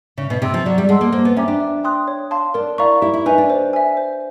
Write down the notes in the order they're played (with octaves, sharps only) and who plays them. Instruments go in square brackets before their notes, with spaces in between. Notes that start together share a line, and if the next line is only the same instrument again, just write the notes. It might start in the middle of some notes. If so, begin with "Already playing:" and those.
[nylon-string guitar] C#3 [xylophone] E5
[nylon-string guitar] B2
[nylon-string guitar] C3 [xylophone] G5 C6 E6
[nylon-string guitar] F3
[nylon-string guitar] F#3 [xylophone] D5
[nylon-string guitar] G3
[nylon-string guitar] G#3 [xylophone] F#5 A5 C6 E6
[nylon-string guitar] A#3
[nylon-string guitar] A#3 [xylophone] C5
[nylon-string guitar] B3
[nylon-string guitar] C#4 [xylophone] E5 G5 A#5 D6
[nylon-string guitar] D4
[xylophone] E5
G5 C6 D#6 F#6
C#5
F5 A5 C6
[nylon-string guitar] D4 [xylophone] A#4
[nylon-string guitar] E4 [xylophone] D5 F5 A#5 C#6
[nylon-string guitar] E4 [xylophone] G4
[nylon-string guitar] E4
[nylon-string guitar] D#4 [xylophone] B4 E5 G#5
[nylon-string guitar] D4
[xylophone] C5
E5 G#5
C5